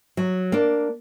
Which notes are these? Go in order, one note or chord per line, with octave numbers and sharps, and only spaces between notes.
F#3
A#3 D4